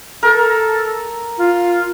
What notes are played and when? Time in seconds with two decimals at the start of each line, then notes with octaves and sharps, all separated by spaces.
0.23 A4 A#4
1.38 F4